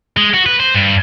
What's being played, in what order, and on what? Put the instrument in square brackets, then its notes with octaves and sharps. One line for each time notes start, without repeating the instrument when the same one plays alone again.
[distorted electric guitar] G#3
F#4
B4
C5
G2